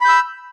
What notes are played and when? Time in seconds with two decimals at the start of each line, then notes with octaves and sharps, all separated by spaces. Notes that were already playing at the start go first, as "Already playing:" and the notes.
0.01 B5
0.05 G6
0.09 E6